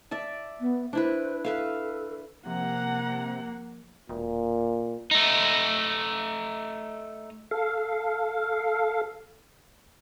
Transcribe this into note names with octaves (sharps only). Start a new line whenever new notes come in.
D5 E5 A5
B3
D4 E4 B4 C5
A4 B4 E5 F5
C3 F3 A#3 F#5 A#5
E1 A#2
A3 D#4
A4 F5